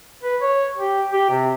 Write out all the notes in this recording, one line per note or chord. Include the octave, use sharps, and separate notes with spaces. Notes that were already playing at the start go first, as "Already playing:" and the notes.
B4
C#5
G4
G4
C3